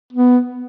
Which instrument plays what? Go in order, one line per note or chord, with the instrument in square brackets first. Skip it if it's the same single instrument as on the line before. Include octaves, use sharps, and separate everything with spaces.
[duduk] B3